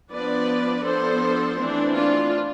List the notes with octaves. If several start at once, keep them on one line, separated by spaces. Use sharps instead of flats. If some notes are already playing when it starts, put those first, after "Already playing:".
F3 B3 D4 B4 D5
F3 B3 D4 A4 C5
E3 A3 C4 D4
D4 F4